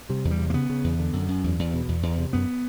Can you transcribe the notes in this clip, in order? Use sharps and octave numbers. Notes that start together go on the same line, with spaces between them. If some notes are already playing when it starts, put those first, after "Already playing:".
C3 G3
E2
G3
C3
A#3
C#3 B3
C#3
E2
D3
F#2
F#2
E2
E2
B2
E2
E2
C3
F#2 B3